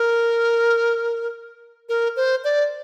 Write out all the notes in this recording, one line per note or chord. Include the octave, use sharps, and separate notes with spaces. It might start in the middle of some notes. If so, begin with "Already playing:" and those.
Already playing: A#4
A#4
C5
D5